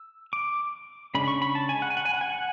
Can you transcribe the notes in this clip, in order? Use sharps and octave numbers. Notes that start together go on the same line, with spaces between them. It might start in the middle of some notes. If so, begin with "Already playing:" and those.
Already playing: E6
D6
C#3 G#3 D4 B5
C#6
B5
A5
G#5
F#5
G#5
F#5
G#5
F#5
G#5
F#5